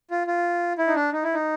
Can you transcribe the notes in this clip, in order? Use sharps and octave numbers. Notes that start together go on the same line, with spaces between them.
F4
F4
E4
D#4
D4
D#4
E4
D#4